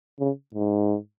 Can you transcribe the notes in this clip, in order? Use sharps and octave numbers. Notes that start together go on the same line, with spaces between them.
C#3
G#2